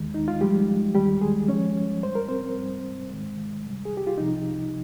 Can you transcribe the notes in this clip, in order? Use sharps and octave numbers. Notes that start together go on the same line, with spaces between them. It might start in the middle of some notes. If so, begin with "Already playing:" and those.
Already playing: D#2 D#3 G#3
D#4
F4
G#2 F3 G3 G#3 G4
D#2 D#3 G3 G4
G#3 G#4
G2 F3 G#3 C#4 C#5
G#2 G3 C5
A#4
C4 C5
G#2 G3
G#2 D#3 G#3
C2 C3 G3
G#4
G4
F4
C2 C3 F3 D#4